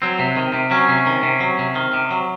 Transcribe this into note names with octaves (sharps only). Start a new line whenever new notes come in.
F#3 C4
C3
D#3
C3
F#3 C#4
C3
D#3
C3
F#3
C3
D#3
C3
F#3